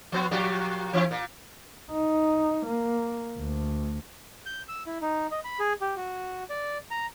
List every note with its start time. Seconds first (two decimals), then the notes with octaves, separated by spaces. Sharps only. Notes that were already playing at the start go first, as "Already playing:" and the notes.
0.12 F3 B3
0.31 A#2 F3 G4
0.93 E3 C4 E4
1.11 A#2
1.91 D#4
2.66 A#3
3.38 D2
4.46 G6
4.68 E6
4.87 E4
5.01 D#4
5.31 D#5
5.44 B5
5.59 G#4
5.81 G4
5.96 F#4
6.50 D5
6.91 A#5